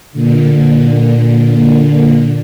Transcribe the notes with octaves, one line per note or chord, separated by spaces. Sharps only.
A#2 D3